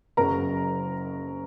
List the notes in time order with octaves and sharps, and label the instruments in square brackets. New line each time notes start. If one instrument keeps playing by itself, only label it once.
[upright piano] F#1 F#2 C#3 F#3 A#4 A#5